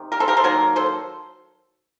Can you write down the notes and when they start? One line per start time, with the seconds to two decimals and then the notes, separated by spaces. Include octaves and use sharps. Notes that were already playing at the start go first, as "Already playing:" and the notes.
Already playing: C3 D#3
0.12 G4 A#4
0.20 A4 C5
0.28 G4 A#4
0.37 A4 C5
0.44 D#3 F#3 A#3 A#4
0.76 A4 C5